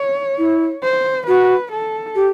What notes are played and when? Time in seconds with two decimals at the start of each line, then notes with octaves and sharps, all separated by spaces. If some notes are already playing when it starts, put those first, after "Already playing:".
Already playing: C#5
0.38 E4
0.83 C5
1.27 F#4 B4
1.72 A4
2.15 G4